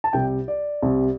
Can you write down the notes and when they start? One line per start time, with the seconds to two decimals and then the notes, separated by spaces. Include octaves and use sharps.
0.04 A5
0.13 C2 C3 G3 G5
0.48 D5
0.82 C2 C3 G3